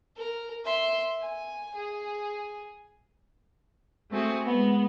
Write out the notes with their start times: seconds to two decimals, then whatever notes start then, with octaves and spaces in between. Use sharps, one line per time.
0.16 A#4
0.65 E5 C6
1.21 G#5
1.75 G#4
4.10 A3 C4 F#4 G#4
4.45 G#3 B3